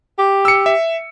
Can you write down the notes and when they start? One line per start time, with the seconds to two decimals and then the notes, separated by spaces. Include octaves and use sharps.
0.18 G4
0.45 E6 C#7
0.66 E5